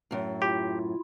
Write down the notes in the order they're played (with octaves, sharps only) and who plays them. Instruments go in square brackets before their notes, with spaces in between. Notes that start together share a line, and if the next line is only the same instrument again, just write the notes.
[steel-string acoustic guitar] F#2 A2
[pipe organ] E4 F4 [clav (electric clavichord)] G4